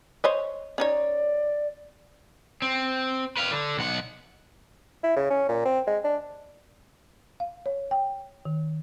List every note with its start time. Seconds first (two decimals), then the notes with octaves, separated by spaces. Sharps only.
0.24 C5 C#5 D#5
0.78 C#4 D#4 C#5 D5
2.62 C4
3.37 B4 F5
3.51 D3
3.77 B1 F#5
5.04 E4
5.16 C#3
5.30 C#4
5.49 A#2
5.65 C4
5.87 G#3
6.04 D4
7.40 F5
7.66 C#5
7.91 G5
8.45 D#3